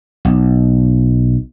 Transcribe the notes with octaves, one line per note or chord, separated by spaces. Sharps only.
B1